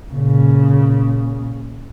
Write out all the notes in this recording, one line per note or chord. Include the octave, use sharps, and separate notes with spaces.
A#2 C#3